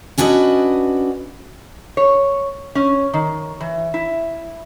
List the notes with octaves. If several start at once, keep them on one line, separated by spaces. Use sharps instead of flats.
C#4 D4 F#4 B4 D#5
C#5
C#4
D#3
E3
E4